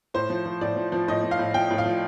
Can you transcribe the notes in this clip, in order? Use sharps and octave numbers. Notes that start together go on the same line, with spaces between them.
A2 C5
F3
F3
A2 D5
F3
F3
A2 D#5
F3
F5
A2
F3 G5
A2
F5
F3